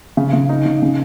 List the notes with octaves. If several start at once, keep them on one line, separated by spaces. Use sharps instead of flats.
C#3
C#3
D#4
C#3
C#3